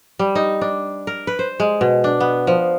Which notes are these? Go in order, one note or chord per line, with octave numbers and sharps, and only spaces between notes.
G3
D#4
D4
A#4
B4
C5
G#3
B2
D4
B3
F3